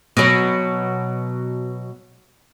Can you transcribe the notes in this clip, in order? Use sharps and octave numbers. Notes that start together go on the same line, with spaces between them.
B2 F#3